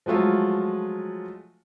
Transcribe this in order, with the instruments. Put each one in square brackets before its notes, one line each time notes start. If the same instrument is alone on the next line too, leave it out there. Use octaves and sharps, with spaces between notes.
[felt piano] F3 F#3 G#3 A3 F4